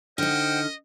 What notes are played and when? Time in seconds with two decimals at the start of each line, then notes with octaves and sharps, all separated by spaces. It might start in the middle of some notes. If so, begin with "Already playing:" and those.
0.18 D3 D#4 C5 D#5 F#5 G5 F6